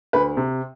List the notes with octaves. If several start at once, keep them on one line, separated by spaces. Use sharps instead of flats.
D2 B4
C3